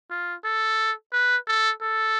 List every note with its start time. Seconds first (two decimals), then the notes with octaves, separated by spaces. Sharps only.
0.10 F4
0.44 A4
1.13 B4
1.47 A4
1.82 A4